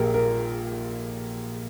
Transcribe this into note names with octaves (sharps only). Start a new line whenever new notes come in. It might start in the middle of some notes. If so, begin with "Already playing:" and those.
Already playing: A#1 A#2 G4 G#4 A#4
A#4